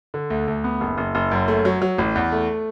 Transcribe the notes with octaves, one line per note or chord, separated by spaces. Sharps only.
D3
D2
D2
B3
F#1
F#1
F#1
F#2
A3
F#3
F#3
A1
E2
A3